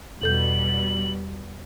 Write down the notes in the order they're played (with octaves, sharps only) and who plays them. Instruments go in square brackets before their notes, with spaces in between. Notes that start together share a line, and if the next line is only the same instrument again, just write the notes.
[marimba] E2 A4 G6 [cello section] B2 G3 [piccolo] F#7